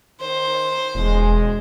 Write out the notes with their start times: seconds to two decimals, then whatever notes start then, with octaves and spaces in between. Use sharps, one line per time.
0.20 D#3 C5
0.95 E1 G#3